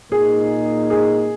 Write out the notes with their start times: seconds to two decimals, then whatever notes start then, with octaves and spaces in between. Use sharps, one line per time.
0.12 A#2 A#3 D#4 G#4
0.90 G#4